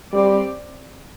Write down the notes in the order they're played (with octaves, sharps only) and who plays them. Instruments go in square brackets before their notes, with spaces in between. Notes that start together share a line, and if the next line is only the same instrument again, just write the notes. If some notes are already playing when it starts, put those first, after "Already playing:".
[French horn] G3 [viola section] C4 G4 D5